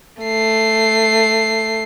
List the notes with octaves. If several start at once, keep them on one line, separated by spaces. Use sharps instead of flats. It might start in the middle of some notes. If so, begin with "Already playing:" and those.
A3 C7